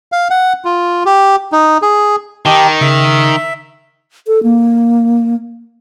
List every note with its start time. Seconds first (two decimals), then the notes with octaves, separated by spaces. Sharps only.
0.12 F5
0.30 F#5
0.65 F4
1.05 G4
1.52 D#4
1.82 G#4
2.46 D#3 D#4 G4 A5 D6
2.81 C#3 E5
4.27 A4
4.43 A#3